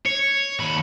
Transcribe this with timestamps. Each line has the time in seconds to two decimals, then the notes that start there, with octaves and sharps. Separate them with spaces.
0.06 C#5
0.60 D#2 B5